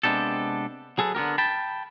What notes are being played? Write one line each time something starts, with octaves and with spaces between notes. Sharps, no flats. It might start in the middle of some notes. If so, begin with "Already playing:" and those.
C3 G#3 B3 D4 G4 A4
F#3 G#4 A4 B4
D3 B3 G4 A#4
G5 A5 B5